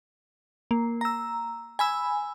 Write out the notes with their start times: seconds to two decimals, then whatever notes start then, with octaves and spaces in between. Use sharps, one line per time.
0.71 A#3
1.01 A#5 E6
1.79 G#5 B5 E6